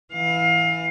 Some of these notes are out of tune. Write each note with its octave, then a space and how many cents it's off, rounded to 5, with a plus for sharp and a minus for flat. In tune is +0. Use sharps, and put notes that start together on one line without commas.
E3 +0 F5 +25